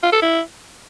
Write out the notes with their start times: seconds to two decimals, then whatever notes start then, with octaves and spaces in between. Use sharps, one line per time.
0.03 F4
0.12 A4
0.22 E4